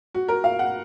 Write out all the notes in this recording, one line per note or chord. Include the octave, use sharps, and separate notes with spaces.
F#4
A#4
F5
F#5